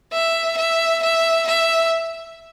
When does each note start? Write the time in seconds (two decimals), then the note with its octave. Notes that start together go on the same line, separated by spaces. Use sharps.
0.13 E5
0.57 E5
1.02 E5
1.47 E5